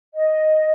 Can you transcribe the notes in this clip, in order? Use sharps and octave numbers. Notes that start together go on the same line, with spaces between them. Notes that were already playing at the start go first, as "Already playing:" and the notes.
D#5